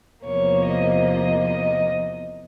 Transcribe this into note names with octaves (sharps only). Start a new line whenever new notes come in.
E2 C3 F3 A#3 C#5
D#5
D#5
D#5